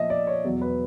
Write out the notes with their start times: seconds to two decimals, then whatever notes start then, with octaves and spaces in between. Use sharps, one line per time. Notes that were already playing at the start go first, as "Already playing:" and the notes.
Already playing: A#2 F3 D#5 E5
0.10 D5
0.27 C#5
0.44 E2 B2 F#3
0.61 B4